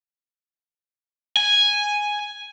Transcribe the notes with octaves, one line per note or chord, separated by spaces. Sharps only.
G#5